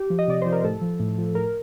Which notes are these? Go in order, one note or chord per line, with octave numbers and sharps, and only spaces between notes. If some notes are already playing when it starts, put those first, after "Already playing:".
Already playing: G4
F3
D#5
C3 D5
F3 C5
A#4
A2 A4
F3
A2
F3
A2 A#4